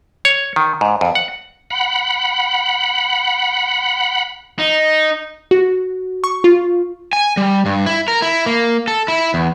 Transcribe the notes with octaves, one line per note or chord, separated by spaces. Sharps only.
C#5
D#3
G#2
F2
F#5
F#5 B5
D#4
F#4
C#6
F4
G#5
G3
G2
E4
A#4
E4
A#3
A4
E4
E2